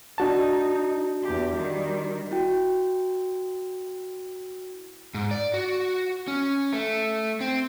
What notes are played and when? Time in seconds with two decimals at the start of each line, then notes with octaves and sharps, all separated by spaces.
0.18 D4 D#4 F#4 A5
1.23 E2 G4
1.56 D#3 G3
2.31 E4 F#4 G5
5.14 G#2
5.31 D5
5.54 F#4
6.28 C#4
6.73 A3
7.41 C4